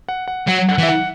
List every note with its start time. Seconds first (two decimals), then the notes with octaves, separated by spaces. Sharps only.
0.09 F#5
0.28 F#5
0.48 F#3 F#5
0.69 F#5
0.78 E3
0.83 E5
0.89 F#5